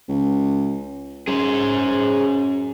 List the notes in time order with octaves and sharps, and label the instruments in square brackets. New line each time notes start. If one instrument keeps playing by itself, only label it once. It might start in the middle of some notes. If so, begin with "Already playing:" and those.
[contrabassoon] C#2
[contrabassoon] F#2 [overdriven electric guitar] G#4 C5